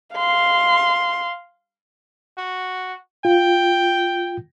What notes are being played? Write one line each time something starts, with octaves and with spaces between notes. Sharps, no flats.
F5 C6
F#4
F4 G5